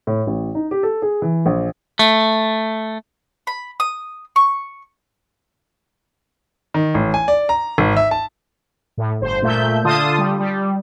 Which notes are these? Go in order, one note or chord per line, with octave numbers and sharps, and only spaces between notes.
A2
A1
D#4
G4
A4
G#4
E3
A#1
A3
B5
D#6
C#6
D#3
A1
G#5
D5
A#5
G#1
E5
A5
A2
G1 C5
A#2 A3 E5 G6
D3 F4 A5 C6 D#6
G3
G3